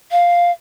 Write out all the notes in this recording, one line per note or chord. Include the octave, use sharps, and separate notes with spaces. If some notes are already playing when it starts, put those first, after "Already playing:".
F5